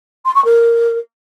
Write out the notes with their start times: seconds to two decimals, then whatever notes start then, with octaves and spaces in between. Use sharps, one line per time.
0.25 C6
0.35 C#6
0.44 A#4